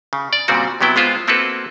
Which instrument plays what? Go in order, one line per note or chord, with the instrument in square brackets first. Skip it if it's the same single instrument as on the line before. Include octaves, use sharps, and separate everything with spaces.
[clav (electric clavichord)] C#3
D5
A#2 C#3 G3 C4 F#4
C3 F#3 B3 E4 G5
G#3 B3 F4 C5
A#3 C4 E4 F#4 A4 B4